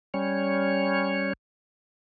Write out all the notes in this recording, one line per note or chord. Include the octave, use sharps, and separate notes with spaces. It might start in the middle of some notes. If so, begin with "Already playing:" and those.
G3 C#4 C#5